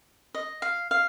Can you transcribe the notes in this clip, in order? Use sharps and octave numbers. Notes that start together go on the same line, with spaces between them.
D#5
F5
F5